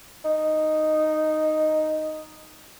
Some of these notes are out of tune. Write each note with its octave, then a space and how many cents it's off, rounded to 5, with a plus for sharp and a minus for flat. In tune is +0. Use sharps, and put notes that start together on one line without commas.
D#4 -5